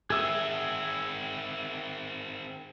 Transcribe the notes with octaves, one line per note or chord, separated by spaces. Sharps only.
D#3 C4 G#4 E5 D#6